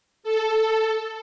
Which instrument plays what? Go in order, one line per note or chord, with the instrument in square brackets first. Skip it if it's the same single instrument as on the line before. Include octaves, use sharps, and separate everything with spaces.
[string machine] A4